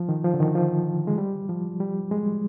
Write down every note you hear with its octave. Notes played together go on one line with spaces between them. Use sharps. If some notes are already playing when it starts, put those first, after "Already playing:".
Already playing: F3
D#3
F3
D3
D#3
F3
G#3
G3
F3
G3
G#3